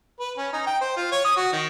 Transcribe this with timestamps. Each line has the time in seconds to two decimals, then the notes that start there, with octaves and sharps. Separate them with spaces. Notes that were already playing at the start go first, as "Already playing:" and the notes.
0.20 B4
0.38 C#4
0.53 D#4
0.67 G5
0.81 C5
0.97 F4
1.12 C#5
1.25 D#6
1.37 F#4
1.52 D#3